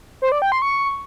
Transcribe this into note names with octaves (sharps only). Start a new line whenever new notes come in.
C5
D5
G5
C6
C#6